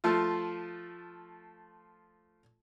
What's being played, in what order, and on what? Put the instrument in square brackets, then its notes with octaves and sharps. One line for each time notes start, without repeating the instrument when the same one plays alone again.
[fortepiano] F3 A3 F4